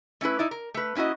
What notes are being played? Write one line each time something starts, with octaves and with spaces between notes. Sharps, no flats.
A3 C#4 E4 B4
D#4 E4 D5
A#4
A3 B4
A#3 C#4 E4 F#4 D#5